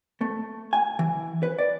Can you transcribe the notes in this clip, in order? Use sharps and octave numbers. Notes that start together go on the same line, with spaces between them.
A3
G#5
E3
B4
D5